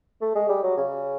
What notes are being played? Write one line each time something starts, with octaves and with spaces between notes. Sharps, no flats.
A3
G#3
G3
F#3
C#3